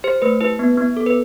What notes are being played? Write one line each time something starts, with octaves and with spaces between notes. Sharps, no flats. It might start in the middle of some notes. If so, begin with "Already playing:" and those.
G4 C5
A3 B4
E4 B4
B3
B3
A4
B4